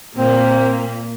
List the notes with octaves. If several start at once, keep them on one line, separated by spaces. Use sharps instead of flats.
A#2 A#3 C4